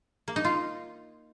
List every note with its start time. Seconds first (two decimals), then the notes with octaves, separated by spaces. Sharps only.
0.28 A#3
0.36 D#4
0.45 F4